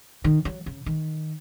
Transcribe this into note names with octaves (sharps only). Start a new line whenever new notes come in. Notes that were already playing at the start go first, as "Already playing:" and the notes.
D#3
F#3
C#3
D#3